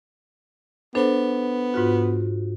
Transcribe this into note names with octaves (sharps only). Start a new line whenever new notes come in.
B3 D4 A4 C5
G#2 F4 F#4